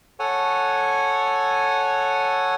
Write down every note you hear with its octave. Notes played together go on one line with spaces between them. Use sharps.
A4 C#5 F#5 G#5